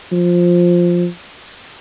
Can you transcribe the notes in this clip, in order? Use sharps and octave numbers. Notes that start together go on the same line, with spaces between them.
F3